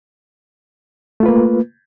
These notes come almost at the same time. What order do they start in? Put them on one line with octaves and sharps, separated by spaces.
A3 F4 B4 A#3